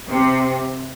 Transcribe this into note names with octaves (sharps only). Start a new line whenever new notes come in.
C3